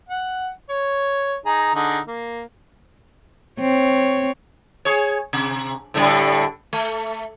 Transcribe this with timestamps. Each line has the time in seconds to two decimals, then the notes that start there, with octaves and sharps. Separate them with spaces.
0.09 F#5
0.70 C#5
1.46 D#4 G#4 A#5
1.75 D3 D#4 G#4
2.07 A#3
3.60 C4 C#5
4.85 G#4 C#5
5.33 C3
5.94 A2 D3 G3
6.73 A3